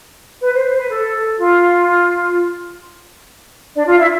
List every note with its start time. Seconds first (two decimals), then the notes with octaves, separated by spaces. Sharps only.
0.42 B4
0.54 C5
0.66 C5
0.78 B4
0.90 A4
1.38 F4
3.75 D4 D5
3.87 F4 F5
3.99 E4 E5